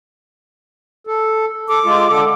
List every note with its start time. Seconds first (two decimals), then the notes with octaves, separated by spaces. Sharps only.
1.07 A4
1.68 A4 D6
1.85 G#3 F4
2.09 D3 A4